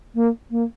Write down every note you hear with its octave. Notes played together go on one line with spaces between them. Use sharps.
A#3
A#3